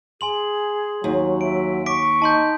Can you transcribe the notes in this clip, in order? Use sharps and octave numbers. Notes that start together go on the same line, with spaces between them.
G#4 G#5 C6 F#7
D#2 F#3
E5 D7
C#6 D6 B6 D7
D#4 A5 C6 G6